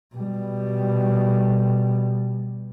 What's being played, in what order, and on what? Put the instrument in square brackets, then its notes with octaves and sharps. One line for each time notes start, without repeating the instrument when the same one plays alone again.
[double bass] B2 G3